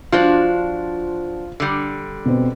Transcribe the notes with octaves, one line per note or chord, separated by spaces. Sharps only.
F3 D4 F4 F#4 C5
D3 G3
B2 C4